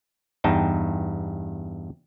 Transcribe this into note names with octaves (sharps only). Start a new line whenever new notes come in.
E2 G2 D#4 G5 A5